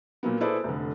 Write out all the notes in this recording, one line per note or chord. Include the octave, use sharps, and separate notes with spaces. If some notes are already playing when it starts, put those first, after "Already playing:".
A#2 F#3 A#3 B3
E4 G#4 A4 B4 C5 D5
F1 D3